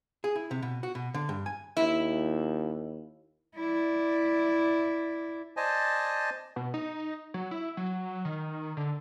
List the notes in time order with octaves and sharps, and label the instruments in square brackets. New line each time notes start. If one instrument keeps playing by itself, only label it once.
[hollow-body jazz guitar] G#4
E4
C3
B2
F#4
B2
D3
G2
G#5
[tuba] D#2 [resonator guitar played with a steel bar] E4
[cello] E4 D5
[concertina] C5 D5 D#5 G#5 A5
[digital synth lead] B2
D#4
F#3
E4
F#3
D#3
D3